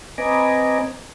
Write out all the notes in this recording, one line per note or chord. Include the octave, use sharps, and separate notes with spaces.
C4 B4 D#5 G#5 A#5 D6